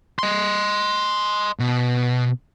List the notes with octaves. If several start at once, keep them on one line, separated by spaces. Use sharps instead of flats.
D#5 C6
B2